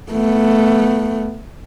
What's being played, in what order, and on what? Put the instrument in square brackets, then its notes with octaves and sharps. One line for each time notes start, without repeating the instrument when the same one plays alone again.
[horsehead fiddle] A3 B3